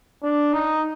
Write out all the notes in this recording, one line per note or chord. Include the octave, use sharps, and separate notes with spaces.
D4
D#4